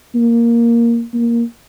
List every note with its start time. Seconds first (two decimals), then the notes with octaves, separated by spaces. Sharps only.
0.15 A#3
1.14 A#3